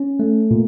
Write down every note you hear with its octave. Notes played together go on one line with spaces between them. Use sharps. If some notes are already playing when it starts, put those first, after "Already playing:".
Already playing: C#4
A3
A#2